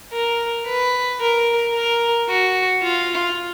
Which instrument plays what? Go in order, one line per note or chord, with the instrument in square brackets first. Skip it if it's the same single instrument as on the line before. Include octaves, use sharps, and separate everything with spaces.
[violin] A#4
B4
A#4
A#4
F#4
F4